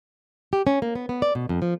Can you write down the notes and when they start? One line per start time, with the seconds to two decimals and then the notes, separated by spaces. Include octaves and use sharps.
0.53 G4
0.67 C#4
0.82 A#3
0.95 B3
1.09 B3
1.22 D5
1.35 B2
1.49 F2
1.62 F3